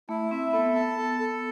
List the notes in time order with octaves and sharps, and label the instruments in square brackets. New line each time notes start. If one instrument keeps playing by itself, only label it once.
[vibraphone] A3 [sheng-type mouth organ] E4
[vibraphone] C4 [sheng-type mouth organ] E5
[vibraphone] B3 [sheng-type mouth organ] A4
[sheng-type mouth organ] A5
A4
A4